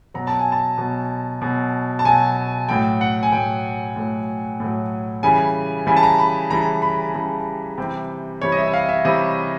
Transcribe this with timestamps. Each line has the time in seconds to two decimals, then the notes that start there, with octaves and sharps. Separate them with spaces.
0.14 B2 F#3 A#5
0.27 A5
0.39 G#5
0.52 A5
0.78 B2 F#3
1.42 B2 F#3
1.99 A5
2.05 B2 F#3 G#5
2.69 A2 F#3 G5
3.01 F#5
3.23 G#5
3.32 A2 F#3 G5
3.96 A2 F#3
4.60 A2 F#3
5.23 C#3 E3 G3 G#5
5.87 C#3 E3 G3 G#5
5.97 A5
6.03 A#5
6.19 B5
6.50 C#3 E3 G3 A#5
6.82 B5
7.14 C#3 E3 G3
7.78 C3 E3 G3 G5
8.41 C3 E3 G3 C#5
8.52 D#5
8.57 E5
8.67 E5
8.73 F5
8.89 E5
9.05 C3 E3 G3 D#5